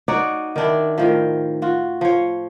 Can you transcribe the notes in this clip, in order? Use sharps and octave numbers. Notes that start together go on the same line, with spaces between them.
D#4 F#4 C#5 D5
D#3 D4 E4
A2 D#3 F3
F4 F#4
F3 C#5